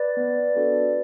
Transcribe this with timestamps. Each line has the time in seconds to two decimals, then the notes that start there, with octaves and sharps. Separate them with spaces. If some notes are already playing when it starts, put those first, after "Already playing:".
Already playing: B4 D5
0.17 B3
0.56 D4 F#4 A4